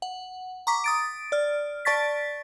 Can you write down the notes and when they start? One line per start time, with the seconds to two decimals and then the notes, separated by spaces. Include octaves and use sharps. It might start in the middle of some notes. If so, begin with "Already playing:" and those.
0.02 F#5
0.67 A#5 C#6 D6 B6
0.84 D#6 A6 D7
1.32 D5 F6
1.85 D5 A5 C#6 A6 B6